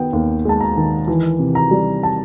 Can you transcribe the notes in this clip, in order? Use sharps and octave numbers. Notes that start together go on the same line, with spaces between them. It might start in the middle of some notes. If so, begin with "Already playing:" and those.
Already playing: D#3 B3 G5
D#2
G#3 A5
A#5
D#3
E3
C3
A#5
G3
A5